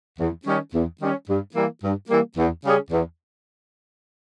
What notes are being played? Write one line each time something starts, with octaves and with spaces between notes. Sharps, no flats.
E2
D#3 G3 C#4
E2
D#3 G3 C#4
G2
E3 G3 A#3
G2
E3 G3 A#3
E2
C#3 G3 C#4 G#4
E2